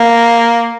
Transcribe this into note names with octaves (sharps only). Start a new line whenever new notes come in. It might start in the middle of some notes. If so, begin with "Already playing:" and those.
Already playing: A#3